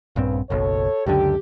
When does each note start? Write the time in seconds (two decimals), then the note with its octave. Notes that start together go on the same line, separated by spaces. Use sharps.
0.16 A#1 G2 C#3 B3 C4
0.50 F#1 B1 B2 A4 C#5
1.06 C#2 F#2 D3 G4